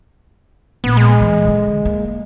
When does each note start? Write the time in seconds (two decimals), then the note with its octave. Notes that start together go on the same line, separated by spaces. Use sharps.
0.84 A#1 B3
0.97 G#3
1.21 E3 B3
1.45 D3 C#4
1.85 A#3